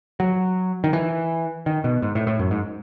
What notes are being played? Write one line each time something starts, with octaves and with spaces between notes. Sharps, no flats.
F#3
D#3
E3
D#3
B2
G#2
A2
A2
F#2
G#2